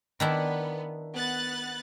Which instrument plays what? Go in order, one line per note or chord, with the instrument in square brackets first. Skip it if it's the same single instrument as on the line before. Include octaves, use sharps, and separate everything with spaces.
[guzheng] D#3 D4 E4 [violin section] B3
[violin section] B3 F#6 A6